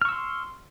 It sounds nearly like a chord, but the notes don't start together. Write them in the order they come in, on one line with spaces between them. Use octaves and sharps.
F6 C#6 E6 C6